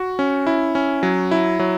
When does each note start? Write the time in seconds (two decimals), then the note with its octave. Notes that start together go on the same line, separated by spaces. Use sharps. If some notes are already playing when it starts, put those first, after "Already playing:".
Already playing: F#4
0.19 C#4
0.47 E4
0.75 C#4
1.03 F#3
1.31 E4
1.59 F#3